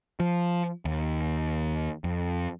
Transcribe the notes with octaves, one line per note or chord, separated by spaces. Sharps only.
F3
D#2
F2